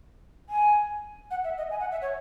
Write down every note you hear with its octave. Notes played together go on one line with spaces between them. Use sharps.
G#5
F#5
E5
D#5
G#5
F#5
E5
C#5